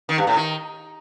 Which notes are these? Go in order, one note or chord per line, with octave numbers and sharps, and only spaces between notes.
D#3
G2
A2
D#3